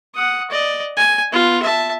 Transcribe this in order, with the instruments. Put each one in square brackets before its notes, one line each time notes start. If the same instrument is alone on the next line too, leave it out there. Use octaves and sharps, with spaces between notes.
[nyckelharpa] F#5 D#6
D5 D#5
G#5
B3 F4
E5 A5